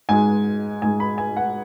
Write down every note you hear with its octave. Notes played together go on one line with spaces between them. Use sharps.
G#2 G#3 G#5
G#2 G#3 G#5
B5
G#5
F#5